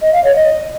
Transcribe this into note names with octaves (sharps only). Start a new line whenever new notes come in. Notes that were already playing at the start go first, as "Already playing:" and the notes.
D#5
F5
C#5
D#5